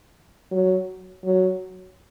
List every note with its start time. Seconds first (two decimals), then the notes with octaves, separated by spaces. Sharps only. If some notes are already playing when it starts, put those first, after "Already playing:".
0.52 F#3
1.25 F#3